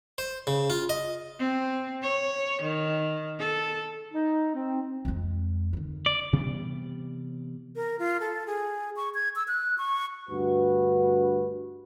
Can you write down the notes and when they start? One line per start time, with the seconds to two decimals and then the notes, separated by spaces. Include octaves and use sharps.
0.18 C5
0.47 C#3
0.70 F4
0.89 D#5
1.39 C4
2.03 C#5
2.62 D#3
3.39 A4
4.13 D#4
4.54 C4
5.05 F2 G#3
5.73 D3 D#3
6.06 D5
6.33 C3 E3 G3 B3
7.76 A#4
7.99 F4
8.20 A4
8.47 G#4
8.97 C#6
9.15 G#6
9.36 E6
9.48 F#6
9.78 C#6
10.29 D2 G2 F#4 B4